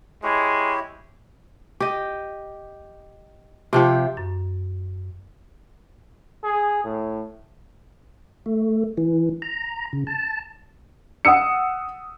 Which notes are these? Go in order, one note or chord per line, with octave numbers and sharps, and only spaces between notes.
G#3 E4 G4 C#5
G4 D#5
C3 F3 G4
F#2
G#4
A2
A3
E3
A#5
C#3
A5
F#5 D#6 E6 C#7